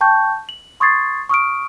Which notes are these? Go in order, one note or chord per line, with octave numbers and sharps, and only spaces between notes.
G5 A5 C#6 G6
F#7
C6 C#6 D#6 G#6 A6 C7
C#6 D#6 F6 D7